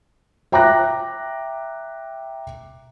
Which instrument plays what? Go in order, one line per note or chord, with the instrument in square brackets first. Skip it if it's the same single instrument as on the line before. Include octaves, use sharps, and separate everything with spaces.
[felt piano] E5 G5 A#5 D6 F#6 A#6